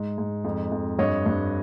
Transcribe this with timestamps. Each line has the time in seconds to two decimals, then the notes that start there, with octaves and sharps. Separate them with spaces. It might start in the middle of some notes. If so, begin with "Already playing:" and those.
Already playing: G#2
0.18 G#2
0.44 F2
0.71 F2
0.99 G2 C#5 D#5
1.26 G2